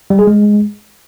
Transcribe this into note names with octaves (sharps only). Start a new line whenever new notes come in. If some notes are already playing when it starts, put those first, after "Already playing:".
G3
G#4
G#3